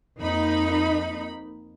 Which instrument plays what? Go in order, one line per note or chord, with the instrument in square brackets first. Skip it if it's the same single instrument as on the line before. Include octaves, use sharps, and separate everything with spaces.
[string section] F2 A#3 B5 [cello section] D#4